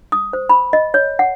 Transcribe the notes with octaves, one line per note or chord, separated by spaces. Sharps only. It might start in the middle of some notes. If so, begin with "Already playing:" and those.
D#6
C5
B5
D#5
C#5
F#5